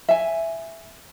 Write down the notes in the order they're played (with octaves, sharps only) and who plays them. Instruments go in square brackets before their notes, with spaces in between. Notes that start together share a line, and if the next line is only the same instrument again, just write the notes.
[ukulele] E5 G#5